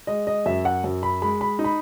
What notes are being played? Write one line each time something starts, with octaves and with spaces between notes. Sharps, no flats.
G#3 D#5
D#5
F#2 E5
F#5
F#2
B5
G#3 B5
B5
D#4
B5